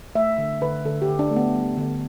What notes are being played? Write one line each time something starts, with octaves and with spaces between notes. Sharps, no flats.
A3 E5
D3
D3 B4
D3 A4
G4
D3
D4
A3
B3
G3
D3